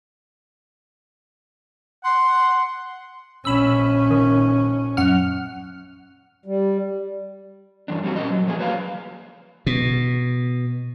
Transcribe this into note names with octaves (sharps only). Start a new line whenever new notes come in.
F#5 C6
A#1 C#4 B5 E6
D#3
F#2 F#5 F6
G3
G2 E3 D4
G3 C4 F#4
A#2 C#4 D#5
F#3
F3 A3 A#3 G#4
F#3 B4 F5
B2